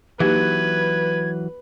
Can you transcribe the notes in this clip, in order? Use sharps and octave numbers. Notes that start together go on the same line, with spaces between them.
E3 F#3 A#3 D#4 G4 B4 G#6